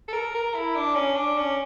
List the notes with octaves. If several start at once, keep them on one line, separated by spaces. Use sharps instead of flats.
A4
A#4
A#4
E4
D4
C#4
D4
C#4